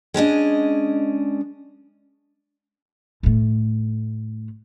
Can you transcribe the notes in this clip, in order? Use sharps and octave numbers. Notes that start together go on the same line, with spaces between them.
G#3 C#4 D4 D#5
A2 A3